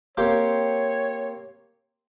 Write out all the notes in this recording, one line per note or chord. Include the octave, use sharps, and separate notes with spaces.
A#3 C4 G4 C#5